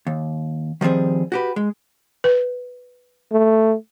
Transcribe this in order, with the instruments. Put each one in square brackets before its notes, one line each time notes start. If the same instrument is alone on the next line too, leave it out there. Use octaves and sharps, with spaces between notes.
[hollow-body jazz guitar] D#2
D#3 F3 G3 C4 G#4
F#4 G4 B4
G#3
[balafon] B4
[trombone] A3